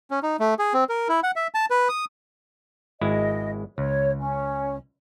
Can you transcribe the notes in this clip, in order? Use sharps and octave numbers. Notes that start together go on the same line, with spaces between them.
C#4
D#4
A3
G#4
C4
A#4
E4
F#5
E5
A5
B4
D#6
G#1 G#3 E4 D#5
C#2 C#5
C#4